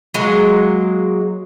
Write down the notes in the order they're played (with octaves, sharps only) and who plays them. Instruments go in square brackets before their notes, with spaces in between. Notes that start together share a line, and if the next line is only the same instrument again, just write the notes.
[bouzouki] F#3 G#3 A#3